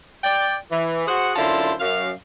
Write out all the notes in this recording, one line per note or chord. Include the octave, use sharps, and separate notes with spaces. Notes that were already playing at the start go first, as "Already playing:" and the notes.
D5 G5
E3
F#4 G#4 C5 F#5
F#2 D3 E4 F4 C5 A5
F#2 F5